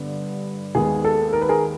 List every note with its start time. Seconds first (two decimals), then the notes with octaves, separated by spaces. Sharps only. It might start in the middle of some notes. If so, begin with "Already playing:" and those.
Already playing: G2 D3 G3 B3
0.75 D#2 D#3 G#3 B3 G#4
1.05 A4
1.33 A#4
1.42 B4
1.49 G#4 A#4